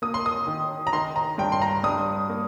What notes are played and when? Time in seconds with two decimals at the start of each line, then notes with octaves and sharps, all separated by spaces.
0.02 A#3 D#6
0.14 C6
0.26 D#6
0.47 D#3
0.87 A#5
0.93 D#3 C6
1.16 A#5
1.38 G2 G5
1.52 C6
1.62 A#5
1.84 G2 D#6
2.30 A#3